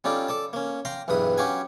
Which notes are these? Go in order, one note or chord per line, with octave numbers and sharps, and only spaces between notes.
G3 C#4 D#4 F4 A4 D5
A4 D5 A5
A#3 C#4
F5 G5 A#5 C6
B1 E2 G2 B4 D#6
C#4 F#4 G4 F5 G#5